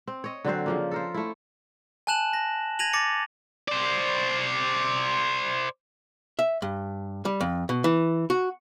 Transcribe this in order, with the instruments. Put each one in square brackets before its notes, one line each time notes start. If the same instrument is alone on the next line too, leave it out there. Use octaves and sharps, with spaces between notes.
[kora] C4
C#5 D#5
D3 F#3 C4 C5
C#3 F3 A#3
A4 A#4 C5
A3 E4
[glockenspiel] G#5 A5 F#6 E7 F#7
A#6
G#6 A#6 D#7 F7 F#7
D6 A6 A#6 C#7
[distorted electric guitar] C5 D5
[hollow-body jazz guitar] E5
G2
G3
F2
B2
E3
F#4